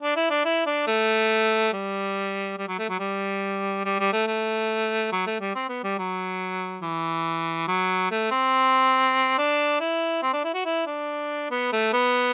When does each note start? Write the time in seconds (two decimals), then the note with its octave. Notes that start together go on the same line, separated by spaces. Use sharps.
0.03 D4
0.16 E4
0.30 D4
0.45 E4
0.66 D4
0.87 A3
1.73 G3
2.58 G3
2.68 F#3
2.79 A3
2.89 F#3
2.99 G3
3.85 G3
4.00 G3
4.13 A3
4.27 A3
5.12 F#3
5.26 A3
5.41 G3
5.55 C4
5.69 B3
5.83 G3
5.98 F#3
6.82 E3
7.68 F#3
8.11 A3
8.31 C4
9.38 D4
9.80 E4
10.23 C4
10.33 D4
10.44 E4
10.54 F#4
10.65 E4
10.87 D4
11.51 B3
11.72 A3
11.93 B3